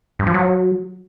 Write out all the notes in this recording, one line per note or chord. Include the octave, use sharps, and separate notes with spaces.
G2
F3
F#3